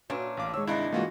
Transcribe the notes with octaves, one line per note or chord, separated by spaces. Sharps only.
A#2 C#4 D4 F#4 B4 C#5 E5
A1 F5 D6
D#3 G#3 C#5 E6
G2 C3 D4 E4 D#5
E3 G#3 A#3 F4 F#4